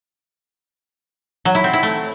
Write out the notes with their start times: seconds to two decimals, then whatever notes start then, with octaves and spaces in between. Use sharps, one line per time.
1.45 F#3
1.55 E4
1.64 C4
1.73 E4
1.83 A3